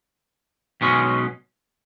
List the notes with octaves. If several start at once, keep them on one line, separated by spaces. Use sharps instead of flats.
B1 B2 G#3 C#4